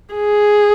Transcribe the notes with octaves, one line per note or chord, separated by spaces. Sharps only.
G#4